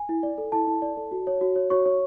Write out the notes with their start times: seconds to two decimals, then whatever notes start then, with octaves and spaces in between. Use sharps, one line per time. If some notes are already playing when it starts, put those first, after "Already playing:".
Already playing: G#5
0.09 E4
0.23 D5
0.38 A4
0.52 E4 A4 A5
0.67 E4
0.82 D5
0.97 A4
1.11 F#4
1.27 C#5
1.41 F#4
1.56 C#5
1.70 F#4 C#5 C#6
1.85 C#5